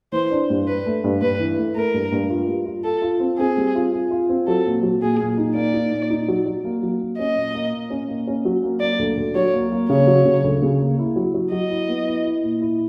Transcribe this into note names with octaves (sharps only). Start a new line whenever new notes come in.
E3 C5
D4
G2
D4 B4
A3
G2
G2 B4
E3
A3
A3 A#4
G2
G2
F4
G3
F4
F4 A4
F4
C4
C4 G#4
G3
F4
F4
F4
C4
F#3 A4
A#2
F#3
A#2 G#4
A#2
D#4
A#3 D5
D#4
A#2
D#4
F#3
F#3
A#3
F#3
A#3
C#4 D#5
A#2
A#3
A#2
C#4
A#3
C#4
F#3
A#3
A#3 D5
D2
D2
F#3 C#5
A#3
A#3
C#3 C#5
F#3
C#3
D2
C#3
A#3
E4
F#3
F#3
F#3 D#5
E4
B3
E4
E4
A#2
E4